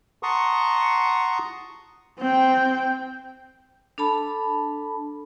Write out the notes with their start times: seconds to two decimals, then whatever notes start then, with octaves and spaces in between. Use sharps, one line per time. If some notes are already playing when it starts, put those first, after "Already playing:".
0.23 F#5 A5 A#5 C6 C#6 D#6
2.18 C4 G5
3.98 D4 A4 A5 B5